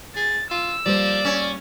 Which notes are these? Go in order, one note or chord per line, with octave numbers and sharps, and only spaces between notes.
G#4 A6
F4 E6
F3 G3 A#3 D5
C#4